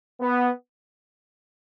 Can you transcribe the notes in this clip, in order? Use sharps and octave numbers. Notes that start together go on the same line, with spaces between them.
B3